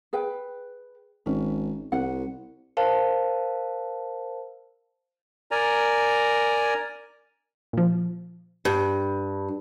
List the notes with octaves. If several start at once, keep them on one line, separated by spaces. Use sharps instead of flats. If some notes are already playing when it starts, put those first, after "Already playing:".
G#4 B4 G5
G#1 C#4
C2 F#5
A#4 C5 F5 A5
A#4 D5 G#5 A#5
A#2 F3
G2